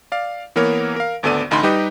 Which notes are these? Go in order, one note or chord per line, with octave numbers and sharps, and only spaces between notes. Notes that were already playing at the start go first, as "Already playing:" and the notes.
D5 F5
E3 A#3 B3 A#4 C#5
A#4 F5
G#1 D2 B3 A4 D5 D#7
A1 D2 D#4 B5 C6
G3 D#4 G4 B4 D#5